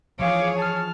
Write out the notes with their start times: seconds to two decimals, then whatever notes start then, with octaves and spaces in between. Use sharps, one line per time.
0.19 E3 F3 G#4 C#5 F5 D6
0.58 A5 F6